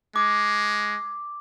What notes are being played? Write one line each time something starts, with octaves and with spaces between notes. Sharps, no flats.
G#3 D6